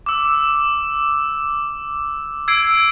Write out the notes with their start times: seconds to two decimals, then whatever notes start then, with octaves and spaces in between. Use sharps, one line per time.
0.06 D6 E6
2.48 E6 G#6 C7 D7